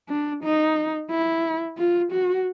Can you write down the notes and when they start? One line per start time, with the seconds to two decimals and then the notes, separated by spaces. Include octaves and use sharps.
0.09 D4
0.44 D#4
1.11 E4
1.78 F4
2.12 F#4